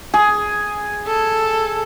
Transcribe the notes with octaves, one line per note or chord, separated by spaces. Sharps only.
G#4
A4